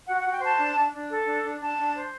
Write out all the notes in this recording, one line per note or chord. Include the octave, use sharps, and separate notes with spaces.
F#4 F#5
F#5
F#4
G5
C5 A5
D4
D4
D4
A4
D4
D4
D4 A5
D4
C5